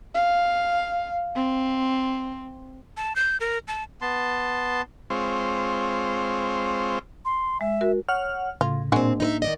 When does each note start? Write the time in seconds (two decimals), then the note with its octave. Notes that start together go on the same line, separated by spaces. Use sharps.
0.15 F5
1.36 C4
2.97 A5
3.16 G6
3.40 A#4
3.68 A5
4.01 B3 A5 C6
5.10 G#3 C4 F4 C5 C#5
7.25 C6
7.61 G#3 E5
7.81 F#4 A#4
8.08 C#5 F#5 F6
8.61 A2 C#3 F4
8.92 A#2 G#3 A#3 C4 D4 F#4
9.20 D#4 B4 E5
9.42 D#3 D5 D#5